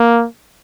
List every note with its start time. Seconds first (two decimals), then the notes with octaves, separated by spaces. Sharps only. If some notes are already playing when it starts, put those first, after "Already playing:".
Already playing: A#3